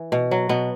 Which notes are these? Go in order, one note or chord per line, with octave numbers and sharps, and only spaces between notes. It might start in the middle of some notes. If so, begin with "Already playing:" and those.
Already playing: E3
B2
F#3
B2 B3